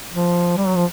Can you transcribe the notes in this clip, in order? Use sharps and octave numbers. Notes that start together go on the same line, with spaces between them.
F3
G3
F#3
F3